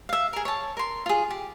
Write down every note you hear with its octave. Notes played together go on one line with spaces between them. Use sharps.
E5 F5
G#4 A#4
C#5 A5
A#4 C6
F4 G#4
G4